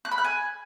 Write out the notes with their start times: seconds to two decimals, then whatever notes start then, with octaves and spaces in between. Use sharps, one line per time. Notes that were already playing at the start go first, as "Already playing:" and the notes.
0.05 F#6
0.11 B5
0.18 F#6
0.24 G#5